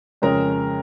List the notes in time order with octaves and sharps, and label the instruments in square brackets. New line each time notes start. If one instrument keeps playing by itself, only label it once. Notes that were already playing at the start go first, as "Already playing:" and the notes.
[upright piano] F2 C#3 G#3 C#4 A#4 A#5